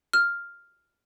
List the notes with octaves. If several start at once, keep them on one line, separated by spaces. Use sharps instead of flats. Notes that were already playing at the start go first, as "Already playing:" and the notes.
F6